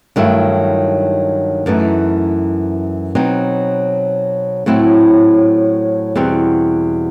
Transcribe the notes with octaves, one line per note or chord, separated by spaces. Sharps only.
G2 D#3 F#3 A3 E4
F#2 E3 A3 D#4
B2 F#3 C4 D#4
A2 F#3 C4 E4
E2 B2 G3 C4